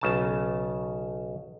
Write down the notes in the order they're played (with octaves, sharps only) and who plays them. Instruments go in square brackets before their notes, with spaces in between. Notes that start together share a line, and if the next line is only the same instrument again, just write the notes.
[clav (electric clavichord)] B1 C#3 A5